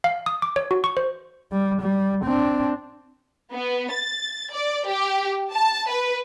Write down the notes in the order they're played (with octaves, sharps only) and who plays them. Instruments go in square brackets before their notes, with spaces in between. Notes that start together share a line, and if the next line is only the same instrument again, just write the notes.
[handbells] F5
D#6
D6
C#5
F#4
C#6
C5
[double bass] G3
G3
C4 D4
[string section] B3
A6
D5
G4
A5
B4